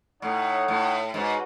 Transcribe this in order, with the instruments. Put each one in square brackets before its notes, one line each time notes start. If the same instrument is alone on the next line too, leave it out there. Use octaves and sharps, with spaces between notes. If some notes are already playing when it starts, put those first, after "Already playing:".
[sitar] A2 [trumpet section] D#4 A4 C#5 F#5
[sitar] A2
[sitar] G#2 [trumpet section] F#4 B4